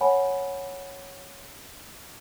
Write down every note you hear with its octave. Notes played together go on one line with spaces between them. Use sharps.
C#5 F#5 G#5 B5